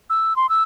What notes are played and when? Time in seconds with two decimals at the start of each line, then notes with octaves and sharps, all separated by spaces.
0.10 E6
0.36 C6
0.49 E6